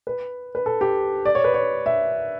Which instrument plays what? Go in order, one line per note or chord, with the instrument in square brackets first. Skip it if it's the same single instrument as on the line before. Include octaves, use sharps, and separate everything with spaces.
[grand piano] B4
B4
A4
G4
D5
C#5
B4
C#5
E5